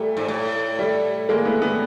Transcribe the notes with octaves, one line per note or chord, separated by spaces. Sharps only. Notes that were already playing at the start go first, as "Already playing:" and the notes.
Already playing: A#2 G3 A3
G#2
A2
G3 A3
G#3 A#3
A3 B3
A3 B3